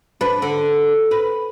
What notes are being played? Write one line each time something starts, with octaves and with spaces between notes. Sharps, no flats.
D4 B4
D3
B4